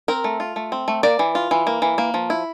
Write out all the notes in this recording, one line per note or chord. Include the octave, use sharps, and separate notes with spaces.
C4 A#4
A3
F4
A3
C4
A3
A#3 D5
E3
F4
E3
A#3
E3
A#3
F3
E4